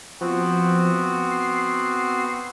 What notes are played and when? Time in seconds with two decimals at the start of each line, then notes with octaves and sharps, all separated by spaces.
0.21 F3 B3 C4 F#4
1.31 C7